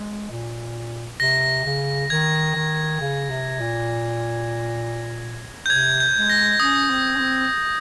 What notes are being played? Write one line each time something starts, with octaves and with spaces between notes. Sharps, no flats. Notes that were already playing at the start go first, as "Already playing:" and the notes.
Already playing: G#3
A#2
C3 A#6
C#3
D#3 G#6
D#3
C#3
C3
A#2
G6
C3 G#6
G6
G#3
A#6
C#4 D#6
C4
C#4
C4